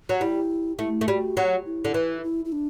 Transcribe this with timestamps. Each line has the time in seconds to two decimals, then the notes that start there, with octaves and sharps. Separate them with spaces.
0.09 F#3
0.20 G3 E4
0.79 A3 E4
1.01 A3
1.07 G3 F#4
1.37 F#3
1.66 E4
1.85 D3
1.94 E3
2.23 E4
2.45 E4
2.52 D4